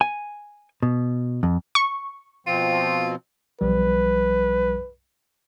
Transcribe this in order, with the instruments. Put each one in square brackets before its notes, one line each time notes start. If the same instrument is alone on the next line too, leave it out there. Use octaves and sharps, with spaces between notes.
[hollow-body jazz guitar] G#5
B2
F2
[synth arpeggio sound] C#6
[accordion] B2 F3 C4 [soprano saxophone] F4
[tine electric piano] B1 F3 G3 [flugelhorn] B4